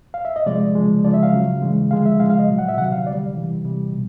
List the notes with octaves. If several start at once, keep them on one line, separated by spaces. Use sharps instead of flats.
F5
E5
D#5
C3 F3 G#3 D5
C#3 F3 G#3
C#3 F3 G#3 D5
E5
F5
C#3 F#3
C#3 E3 G#3
D3 F3 G#3 F5
E5
C#3 F3 G#3 F5
F5
D#5
A#2 F#3
F#5
E5
C3 D#3 F#3 F#5
F5
D3 G3 D5
C3 E3 G3
C3 E3 G3
B2